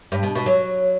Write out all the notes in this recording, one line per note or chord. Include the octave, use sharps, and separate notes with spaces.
G2
B2
B2
F#3